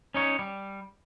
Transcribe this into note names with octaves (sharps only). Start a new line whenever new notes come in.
C#4 D#4 C#5
G3